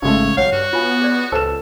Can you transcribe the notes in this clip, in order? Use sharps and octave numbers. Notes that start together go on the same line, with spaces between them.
G#1 C#3 G#3 A3 C#5
B1 C#5 F5 F#5
G2 F#4
B3 F4 F5 G#5
G#4 D5
C#2 A4 B4 C5 E7